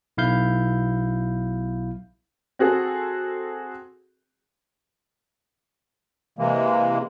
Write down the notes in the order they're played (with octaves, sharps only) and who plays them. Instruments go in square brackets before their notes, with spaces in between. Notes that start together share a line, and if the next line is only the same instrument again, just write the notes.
[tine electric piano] B1 E4 F5 G6
[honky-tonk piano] C4 F#4 G#4 A4
[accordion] C3 E3 G#3 A#3